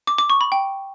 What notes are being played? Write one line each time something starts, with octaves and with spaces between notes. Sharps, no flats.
D6
D6
C#6
B5
G5